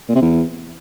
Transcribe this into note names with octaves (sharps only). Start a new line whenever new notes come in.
A#2
C3
E2